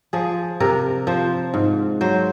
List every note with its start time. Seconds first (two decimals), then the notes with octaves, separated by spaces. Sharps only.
0.13 F3 G#4
0.60 C3 A#4
1.07 F3 C5
1.54 G#2
2.01 F#3 C5